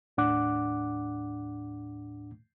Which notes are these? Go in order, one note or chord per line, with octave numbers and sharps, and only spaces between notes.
D#2 A2 D4 F#5 D6 F#6